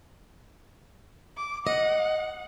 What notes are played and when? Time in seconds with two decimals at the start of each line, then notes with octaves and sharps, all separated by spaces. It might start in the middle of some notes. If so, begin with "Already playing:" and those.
1.37 D6
1.67 D#5 F#5